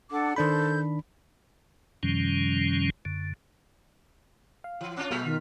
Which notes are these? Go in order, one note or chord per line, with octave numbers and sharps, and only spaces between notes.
D4 A4 F#5 D6
D#3 D4 A4 C5 B5 G6
F#2 C3 D#3 F3 G3 C#4
F#2 D3
F5
E3
C#4 D4 F4
B2 F#3 G#3 A3 F6 B6
D#3 F4